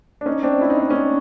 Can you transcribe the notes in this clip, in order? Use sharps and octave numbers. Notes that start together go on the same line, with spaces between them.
D4
C#4 D#4
C4 D4
E4
D#4
D4
C#4 D#4